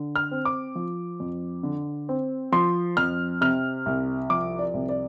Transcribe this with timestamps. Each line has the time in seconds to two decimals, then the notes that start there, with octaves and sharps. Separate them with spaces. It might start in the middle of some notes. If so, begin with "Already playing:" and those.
Already playing: D3
0.16 F6
0.31 C4
0.45 D6
0.75 F3
1.20 F2
1.63 D3
2.09 C4
2.52 F3 C6
2.97 F2 F6
3.41 C3 F6
3.86 C2
4.30 F3 D6
4.59 D5
4.74 C2
4.89 D5